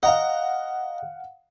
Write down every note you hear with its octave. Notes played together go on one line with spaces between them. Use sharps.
D#5 F5 F#5 A#5